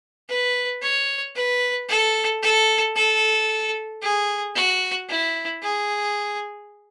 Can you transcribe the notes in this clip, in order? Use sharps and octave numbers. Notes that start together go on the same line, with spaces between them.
B4
C#5
B4
A4
A4
A4
G#4
F#4
E4
G#4